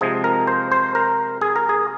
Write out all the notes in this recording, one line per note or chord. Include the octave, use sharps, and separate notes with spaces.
C3 F3 G#3 G#4
A#4
C5
C5
A#4
G#4
A#4
G#4